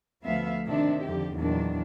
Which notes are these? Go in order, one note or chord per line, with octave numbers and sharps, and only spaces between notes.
D2 F3 A3 B3 E5 F5
C3 D#3 D4 E5
F2 D3 G4
E2 A#2 D#3 F#3 D4